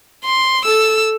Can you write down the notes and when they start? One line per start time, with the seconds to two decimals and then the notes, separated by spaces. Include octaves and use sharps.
0.25 C6
0.65 A4 E6